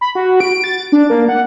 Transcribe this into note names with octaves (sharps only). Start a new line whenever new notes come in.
B5
F#4
D7
A6
D4
A#3
F#5